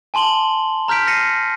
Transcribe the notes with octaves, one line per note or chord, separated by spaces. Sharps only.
G#5 A5 C6 F#7 G7
A#5 F6 G6 B6 D7
F6 A#6 C7 C#7 D#7